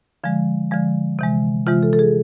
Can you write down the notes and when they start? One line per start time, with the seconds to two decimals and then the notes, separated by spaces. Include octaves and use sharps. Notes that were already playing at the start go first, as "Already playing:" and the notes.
0.24 D3 F3 G#3
0.71 D3 F3 G#3
1.19 C3 E3 G#3
1.67 C3 E3 G#3 F4
1.83 A4
1.93 A4
1.99 G#4